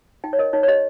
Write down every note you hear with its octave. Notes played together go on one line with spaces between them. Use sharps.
D#4 G5
C#5
A#4 D#5
D#4 C#5
C#5
G4 D#5